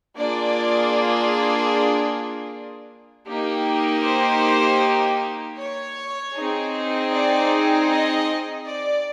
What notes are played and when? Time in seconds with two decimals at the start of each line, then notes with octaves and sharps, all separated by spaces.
0.17 A#3 D4 F4 G#4 D5
3.27 A#3 D#4 G4
4.04 C5
5.58 C#5
6.36 C4 D#4 G#4
7.13 D5
7.90 D#5
8.67 D5